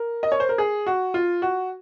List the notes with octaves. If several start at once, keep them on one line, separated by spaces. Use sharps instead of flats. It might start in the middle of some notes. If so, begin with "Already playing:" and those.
Already playing: A#4
D#5
C#5
C5
A#4
G#4
F#4
F4
F#4